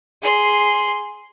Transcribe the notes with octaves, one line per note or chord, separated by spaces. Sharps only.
G#4 C6